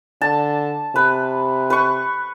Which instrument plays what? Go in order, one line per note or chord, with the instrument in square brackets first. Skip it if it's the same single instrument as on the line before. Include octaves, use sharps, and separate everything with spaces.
[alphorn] D3 [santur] A5
[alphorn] C3 [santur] B4
[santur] B4 C#6